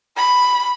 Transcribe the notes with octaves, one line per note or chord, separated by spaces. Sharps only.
B5